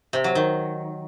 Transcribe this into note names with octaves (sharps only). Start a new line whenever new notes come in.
C3
F#3
D#3